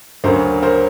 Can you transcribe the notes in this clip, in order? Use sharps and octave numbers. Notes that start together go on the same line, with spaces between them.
D2 C#3 F#3 A#4 C5
A#4 C5